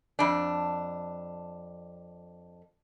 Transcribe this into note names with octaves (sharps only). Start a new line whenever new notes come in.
F2 D4